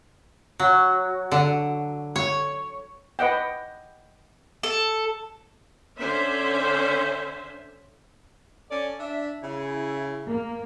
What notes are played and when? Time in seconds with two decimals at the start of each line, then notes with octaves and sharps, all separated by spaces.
0.59 F#3
1.31 D3
2.16 C#5
3.19 B4 D#5 F#5 G5
4.63 A4
5.98 D3 C#4 C5 E5
8.70 C#4 A4 D5
9.00 D4 E5
9.43 C#3 E4
10.29 A#3